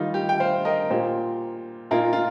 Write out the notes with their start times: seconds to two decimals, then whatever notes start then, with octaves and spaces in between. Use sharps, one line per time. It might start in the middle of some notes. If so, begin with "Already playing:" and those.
Already playing: D#3 G3 D#4 F4
0.14 G4
0.29 G5
0.40 C5 F5
0.65 A#4 D#5
0.90 A#2 A#3 F4 G4 C5
1.91 A#2 A#3 D#4 F4 A#4
2.13 F4